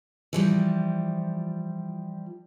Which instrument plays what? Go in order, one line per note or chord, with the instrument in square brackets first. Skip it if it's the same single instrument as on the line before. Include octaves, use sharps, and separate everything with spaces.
[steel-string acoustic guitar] E3 F3 G3